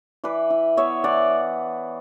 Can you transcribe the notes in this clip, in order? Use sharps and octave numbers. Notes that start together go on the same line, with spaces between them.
E3 B4 D5
E4
B3 C#5 E5
E3 D5 F#5